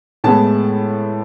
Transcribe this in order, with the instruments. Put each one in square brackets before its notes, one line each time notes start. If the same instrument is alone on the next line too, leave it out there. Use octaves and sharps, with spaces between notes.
[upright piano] A2 G#3 B3 A5